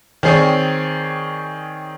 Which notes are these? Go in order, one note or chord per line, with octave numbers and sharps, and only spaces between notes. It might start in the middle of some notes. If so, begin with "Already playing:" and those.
D#3 C4 G#4 C#5 D5